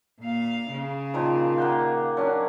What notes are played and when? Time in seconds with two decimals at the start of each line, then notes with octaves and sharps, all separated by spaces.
0.20 A#2 F5
0.71 C#3
1.14 A#2 D#3 F3
1.58 A#3 F#5 G5
2.17 F#3 C#4 D4